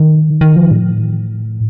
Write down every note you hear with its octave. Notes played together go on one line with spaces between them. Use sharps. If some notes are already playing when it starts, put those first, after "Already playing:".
Already playing: D#3
D#3
F3
A2